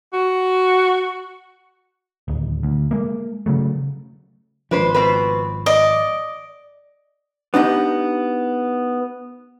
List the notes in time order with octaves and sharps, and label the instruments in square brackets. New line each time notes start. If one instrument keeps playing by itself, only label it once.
[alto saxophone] F#4
[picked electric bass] D1 D#2
D2
G#3 A#3
C#3 F#3 A3
[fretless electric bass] G#1 F3 [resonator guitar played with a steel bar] D4 B4 C5
[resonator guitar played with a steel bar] B2 C4 B4
[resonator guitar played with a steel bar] D5 [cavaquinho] D#5
[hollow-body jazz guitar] B3 D4 D#4 G4